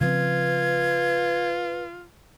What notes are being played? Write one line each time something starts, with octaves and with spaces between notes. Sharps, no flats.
C#3 F3 C4 F4 B4 G#6